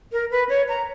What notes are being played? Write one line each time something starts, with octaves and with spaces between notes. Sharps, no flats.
A#4
B4
C#5
A#5